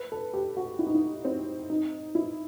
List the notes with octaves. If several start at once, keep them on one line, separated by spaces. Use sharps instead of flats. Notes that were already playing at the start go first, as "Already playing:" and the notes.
Already playing: B4
A4
G4
F#4
E4
D#4
E4
C4
D#4
E4